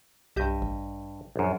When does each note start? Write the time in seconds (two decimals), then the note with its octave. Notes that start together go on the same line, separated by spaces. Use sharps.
0.36 B1 G2 G4 D#5 E5 G6
0.62 A1
1.36 A#1 F#2